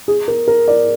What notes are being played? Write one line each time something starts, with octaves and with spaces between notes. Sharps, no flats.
G#4
A#4
A#4
D5